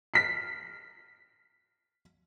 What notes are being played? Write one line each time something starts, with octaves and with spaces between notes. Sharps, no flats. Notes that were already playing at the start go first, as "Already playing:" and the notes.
F6 B6 C7